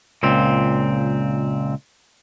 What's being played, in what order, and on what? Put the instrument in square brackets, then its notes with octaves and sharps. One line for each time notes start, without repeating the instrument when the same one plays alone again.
[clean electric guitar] C#2 A#2 C4